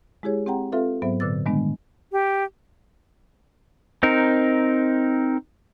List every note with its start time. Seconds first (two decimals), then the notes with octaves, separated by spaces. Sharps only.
0.23 G#3 E4 G4 G#4 C#5
0.46 C4 G4 F#5 G5 A#5
0.72 C4 F4 A4 B4 E5 F5
1.02 G#2 F#3 B3 C5 E5
1.20 A#2 D3 B4 D6 E6 A6
1.46 D#3 G3 G#3 B3 D4
2.12 G4
4.03 C4 D#4 A#4